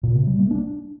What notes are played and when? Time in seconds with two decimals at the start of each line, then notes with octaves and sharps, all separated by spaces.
0.03 A#2
0.15 C3
0.27 G3
0.39 A#3
0.51 D4